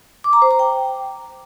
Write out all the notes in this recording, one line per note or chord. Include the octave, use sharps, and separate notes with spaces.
D6
A#5
C5
A#5
G5